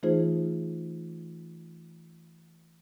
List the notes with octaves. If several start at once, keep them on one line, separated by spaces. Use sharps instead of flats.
E3 A3 D#4 F4 G#4 C5